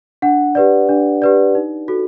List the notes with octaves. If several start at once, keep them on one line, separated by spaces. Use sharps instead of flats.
D4 F#5
G4 B4 D5
D4
G4 B4 D5
D#4
F#4 A4